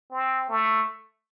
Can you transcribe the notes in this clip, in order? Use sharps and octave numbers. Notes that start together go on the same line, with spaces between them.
C4
A3